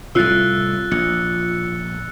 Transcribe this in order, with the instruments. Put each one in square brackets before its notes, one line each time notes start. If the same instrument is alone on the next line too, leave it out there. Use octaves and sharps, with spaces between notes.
[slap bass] C2 A2 [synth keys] F4 [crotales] E6 F#6 A6
[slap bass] A#1 [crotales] C#7